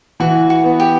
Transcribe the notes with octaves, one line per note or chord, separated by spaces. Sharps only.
E3 F#4
F#4
B3
G4